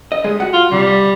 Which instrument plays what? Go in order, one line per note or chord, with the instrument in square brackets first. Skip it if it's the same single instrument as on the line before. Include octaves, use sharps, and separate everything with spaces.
[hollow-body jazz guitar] D#5
G3 G#3 G#4
F#4 F#5
[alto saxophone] F4
[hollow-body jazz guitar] C3 [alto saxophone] G3